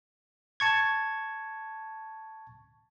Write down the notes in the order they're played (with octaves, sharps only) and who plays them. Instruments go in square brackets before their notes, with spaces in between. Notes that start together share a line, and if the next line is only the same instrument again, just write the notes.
[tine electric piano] A5 C#6 G#6